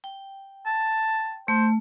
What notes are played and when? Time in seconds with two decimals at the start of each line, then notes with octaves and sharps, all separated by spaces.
0.04 G5
0.66 A5
1.48 A3 C5